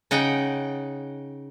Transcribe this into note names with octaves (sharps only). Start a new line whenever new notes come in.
C#3 D#4 F#5 G5